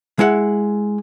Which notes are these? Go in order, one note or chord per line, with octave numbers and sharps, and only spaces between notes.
G#3 E4 F#5